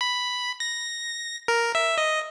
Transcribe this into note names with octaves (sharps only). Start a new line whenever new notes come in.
B5
A#6
A#4
E5
D#5